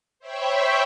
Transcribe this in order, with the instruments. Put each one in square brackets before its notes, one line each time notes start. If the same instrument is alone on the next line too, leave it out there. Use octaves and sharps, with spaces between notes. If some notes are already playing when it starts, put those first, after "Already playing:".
[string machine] C5 C#5 E5 G5 B5 C#6